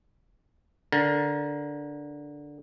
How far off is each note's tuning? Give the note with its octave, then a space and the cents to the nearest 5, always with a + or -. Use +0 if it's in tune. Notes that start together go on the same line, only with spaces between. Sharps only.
D3 -5 A#4 +15